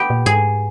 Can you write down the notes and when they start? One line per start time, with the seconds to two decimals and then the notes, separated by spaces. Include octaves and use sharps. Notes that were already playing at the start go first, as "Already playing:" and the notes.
Already playing: B3 G4
0.10 A#2
0.26 G#2 G#4